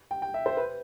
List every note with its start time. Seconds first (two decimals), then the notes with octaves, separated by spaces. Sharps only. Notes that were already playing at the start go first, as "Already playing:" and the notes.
0.11 G5
0.22 G5
0.34 E5
0.46 C5
0.57 B4